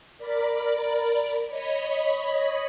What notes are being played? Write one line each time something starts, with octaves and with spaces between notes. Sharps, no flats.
A#4 D5 B5
C#5 D#5 B5